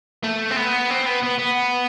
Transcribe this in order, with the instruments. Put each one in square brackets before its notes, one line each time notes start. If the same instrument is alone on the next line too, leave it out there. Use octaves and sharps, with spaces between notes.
[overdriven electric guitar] A3
C4
B3
C4
B3
B3
B3